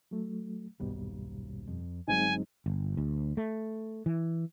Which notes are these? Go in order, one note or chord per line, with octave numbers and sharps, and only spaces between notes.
F#3 A3
D#1 B1 G2 B2 G3
F2
G1 F#3 G#3 C4 D#4 G#5
G1
D2
A3
E3